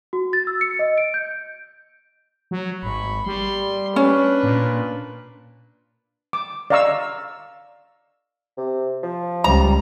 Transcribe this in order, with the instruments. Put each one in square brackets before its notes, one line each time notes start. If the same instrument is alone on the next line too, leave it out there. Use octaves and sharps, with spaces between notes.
[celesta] F#4
A6
E6
C#7
D#5
D7
G6
[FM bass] F#3
[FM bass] G#1 [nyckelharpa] B5 C#6
[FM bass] G3 [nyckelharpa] C6
[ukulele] C#4 [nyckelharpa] D4 B4
[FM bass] A#2
[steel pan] D6
D5 D#5 F5 A#5 C#6 E6
[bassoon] C3
F3
[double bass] C#2 G3 [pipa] A#5